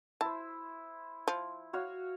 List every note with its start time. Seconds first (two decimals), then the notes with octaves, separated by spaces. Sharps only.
0.21 E4 C5 A5
1.28 F3
1.73 F#4 C#5 F5